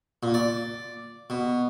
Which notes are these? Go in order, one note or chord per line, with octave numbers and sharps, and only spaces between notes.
A#2
D5
B2